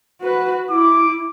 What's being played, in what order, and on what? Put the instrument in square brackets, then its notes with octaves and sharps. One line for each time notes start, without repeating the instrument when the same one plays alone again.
[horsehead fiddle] F#4 B4
[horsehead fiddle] E4 [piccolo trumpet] D6